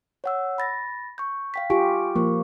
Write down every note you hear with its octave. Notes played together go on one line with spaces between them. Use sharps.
C#5 F#5 E6
B5 A6 A#6
C#6 G6
F5 G5 B6
F4 G4 G#5 C#6 D7
F3 A#3 F4 C#6